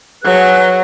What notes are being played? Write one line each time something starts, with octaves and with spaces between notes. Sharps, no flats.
F#3 G#4 B4 F#6